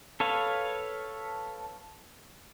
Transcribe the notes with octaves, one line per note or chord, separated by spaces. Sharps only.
A4 B4 C#5 F5